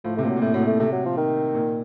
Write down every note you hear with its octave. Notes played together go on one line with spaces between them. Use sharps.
A2 F3
C3 A3
A#2 F3
F#3
A#2
A2 A3
A2 F#3
A#2
A3
C3 A3
F#3
F3
D#3
A#2